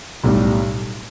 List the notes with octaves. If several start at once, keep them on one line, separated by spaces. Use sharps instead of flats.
B1 A2 G3